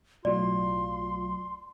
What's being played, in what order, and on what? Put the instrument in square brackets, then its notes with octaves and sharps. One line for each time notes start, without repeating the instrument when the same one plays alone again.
[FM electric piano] B1 A2 F#3 [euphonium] F4 [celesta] D5 [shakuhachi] C6